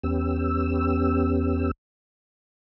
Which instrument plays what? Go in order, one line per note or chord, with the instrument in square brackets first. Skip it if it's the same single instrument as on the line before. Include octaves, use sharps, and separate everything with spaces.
[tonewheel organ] E2 B3 C#4 G4 E6